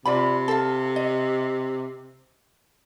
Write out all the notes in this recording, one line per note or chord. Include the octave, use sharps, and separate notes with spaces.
C3 F4 D5 B5
A4 F5
D#5